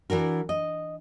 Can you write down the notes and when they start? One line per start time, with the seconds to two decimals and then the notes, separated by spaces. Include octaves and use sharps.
0.10 E3 D4 F#4 A#4
0.49 D#5